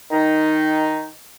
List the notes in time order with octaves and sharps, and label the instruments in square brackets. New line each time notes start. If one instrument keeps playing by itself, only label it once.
[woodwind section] D#3 D#4